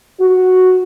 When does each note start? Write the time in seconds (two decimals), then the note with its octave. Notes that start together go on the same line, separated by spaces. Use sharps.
0.20 F#4